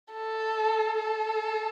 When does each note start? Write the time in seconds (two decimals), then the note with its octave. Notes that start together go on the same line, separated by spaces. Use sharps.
0.13 A4
0.99 A4